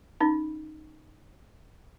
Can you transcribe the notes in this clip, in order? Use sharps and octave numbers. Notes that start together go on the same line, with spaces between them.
C#4 D#4